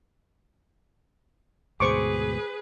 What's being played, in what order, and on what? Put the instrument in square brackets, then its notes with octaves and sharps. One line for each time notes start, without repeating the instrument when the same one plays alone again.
[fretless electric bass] D2 G#2 B2 [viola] G#4 B4 [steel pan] C5 C#6 D6